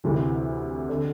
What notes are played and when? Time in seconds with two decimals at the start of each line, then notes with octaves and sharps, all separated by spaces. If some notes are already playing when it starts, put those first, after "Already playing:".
0.04 D2 C3 E3
0.89 D3